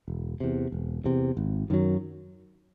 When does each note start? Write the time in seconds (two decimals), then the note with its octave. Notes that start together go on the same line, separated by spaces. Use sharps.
0.08 E1
0.40 E2 C3
0.72 E1
1.04 E2 C3
1.37 G#1
1.70 F#2 D#3 F#3